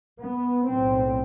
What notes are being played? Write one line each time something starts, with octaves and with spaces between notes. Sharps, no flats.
B3
B1 A2 C4